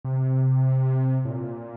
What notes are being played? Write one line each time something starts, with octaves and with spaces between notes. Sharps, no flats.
C3
A2
A#2